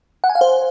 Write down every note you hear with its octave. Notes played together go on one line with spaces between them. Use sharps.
F#5
G#5
F5
C5